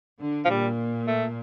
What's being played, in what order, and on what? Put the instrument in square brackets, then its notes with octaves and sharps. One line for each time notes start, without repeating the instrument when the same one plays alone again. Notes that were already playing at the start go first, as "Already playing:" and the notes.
[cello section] D3
[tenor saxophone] F3
[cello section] A#2 [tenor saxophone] G3
[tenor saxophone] A3